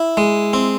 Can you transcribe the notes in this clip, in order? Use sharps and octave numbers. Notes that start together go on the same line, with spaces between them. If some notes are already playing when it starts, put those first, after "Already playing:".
Already playing: E4
G#3
C4